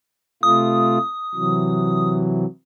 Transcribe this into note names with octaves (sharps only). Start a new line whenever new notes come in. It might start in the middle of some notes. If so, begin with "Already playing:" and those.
C3 A3 F4 D#6
C3 E3 F#3